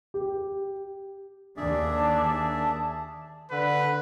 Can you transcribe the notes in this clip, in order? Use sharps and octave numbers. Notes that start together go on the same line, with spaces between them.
G4
D#2 D#3 D4 G#4 D5 E5
A5
D3 B4